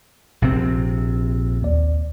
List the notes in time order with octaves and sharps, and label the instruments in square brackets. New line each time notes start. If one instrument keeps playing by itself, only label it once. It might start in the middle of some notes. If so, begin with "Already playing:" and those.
[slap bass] A#1 C3 C4
[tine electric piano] D#2 D5